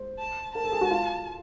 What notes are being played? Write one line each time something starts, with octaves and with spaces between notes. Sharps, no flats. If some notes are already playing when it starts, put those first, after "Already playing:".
Already playing: C5
A5
A#4 A5
A4
G#4
F#4
F4